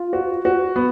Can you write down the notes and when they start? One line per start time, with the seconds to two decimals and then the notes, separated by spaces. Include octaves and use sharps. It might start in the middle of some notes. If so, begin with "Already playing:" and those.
Already playing: F4
0.13 F#4
0.45 F#4
0.76 B3